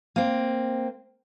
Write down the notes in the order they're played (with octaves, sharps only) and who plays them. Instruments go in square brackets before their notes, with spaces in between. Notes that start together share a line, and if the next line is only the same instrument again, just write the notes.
[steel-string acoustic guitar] A#3 C4